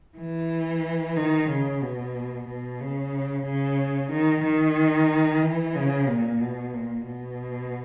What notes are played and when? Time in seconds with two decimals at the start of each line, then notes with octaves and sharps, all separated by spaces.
0.18 E3
1.16 D#3
1.49 C#3
1.81 B2
2.47 B2
2.80 C#3
3.45 C#3
4.11 D#3
4.44 D#3
5.43 E3
5.75 C#3
6.08 A#2
6.41 B2
6.74 A#2
7.06 B2